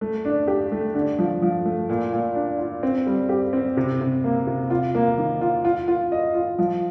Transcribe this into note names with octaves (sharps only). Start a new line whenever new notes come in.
A3
D4
G4
A3
D3
F3
F3
A3
A#2
A#2
D4
F4
C4
G3
G4
C4
C3
C3
A#3
C3
F4
A#3
D#3
F4
F4
F4
D#5
F4
F3